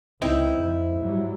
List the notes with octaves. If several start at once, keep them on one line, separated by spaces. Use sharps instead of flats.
C#2 C4 D#4 E4
F2
G#2 F#3 G3